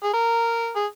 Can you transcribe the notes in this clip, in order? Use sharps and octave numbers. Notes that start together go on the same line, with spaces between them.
G#4
A#4
G#4